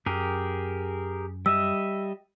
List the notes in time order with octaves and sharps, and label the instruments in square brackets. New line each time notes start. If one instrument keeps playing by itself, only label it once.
[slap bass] F#2 [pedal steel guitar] G4 G#4 A#4
[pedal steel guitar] G3 D#5 E5 [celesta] E6